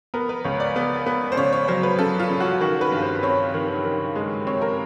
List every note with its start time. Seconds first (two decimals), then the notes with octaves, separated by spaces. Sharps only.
0.14 B3 A#4
0.29 B4
0.44 C#2 C#5
0.60 D5
0.76 B3
1.06 B3
1.32 C5
1.37 C#3 C#5
1.53 C#5
1.68 F#3 C5
1.83 B4
1.99 C#3 A4
2.20 F4
2.29 C#3
2.40 F#4
2.61 D#3 F#4
2.81 B4
2.92 G2
3.02 C5
3.23 C4 C#5
3.54 D#3
3.84 D#3
4.15 G#3
4.47 C4 C#5
4.62 A#4